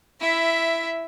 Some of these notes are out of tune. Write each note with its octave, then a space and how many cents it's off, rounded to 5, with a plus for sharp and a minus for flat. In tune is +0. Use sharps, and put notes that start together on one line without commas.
E4 +10 E5 +0